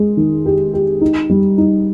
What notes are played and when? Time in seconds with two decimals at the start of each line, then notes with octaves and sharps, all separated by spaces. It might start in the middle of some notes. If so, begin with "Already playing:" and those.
Already playing: G#3
0.17 D#3
0.46 G4
0.73 G4
1.01 D#4
1.30 G3
1.58 D#4